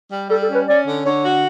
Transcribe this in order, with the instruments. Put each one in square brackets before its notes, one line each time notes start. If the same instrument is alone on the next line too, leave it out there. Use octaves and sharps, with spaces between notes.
[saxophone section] G3
[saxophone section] G3 [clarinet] A4
[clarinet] A4
[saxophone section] C#4
[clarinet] B4
[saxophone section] C#4 [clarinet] D5
[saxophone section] D3
[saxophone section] D3 [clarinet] C#5
[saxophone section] F#4